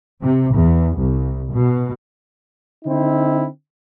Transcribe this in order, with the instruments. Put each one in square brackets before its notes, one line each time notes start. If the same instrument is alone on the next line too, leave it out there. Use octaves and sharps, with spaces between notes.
[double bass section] C3
E2
C2
B2
[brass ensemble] D3 C4 D#4 E4